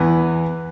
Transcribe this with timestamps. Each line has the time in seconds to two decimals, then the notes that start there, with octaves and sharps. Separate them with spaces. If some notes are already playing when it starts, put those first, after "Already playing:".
Already playing: E2 E3 B3 B4